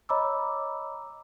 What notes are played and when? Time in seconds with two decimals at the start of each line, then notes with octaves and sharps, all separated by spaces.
0.09 C#5 D#5 A#5 B5 D6 E6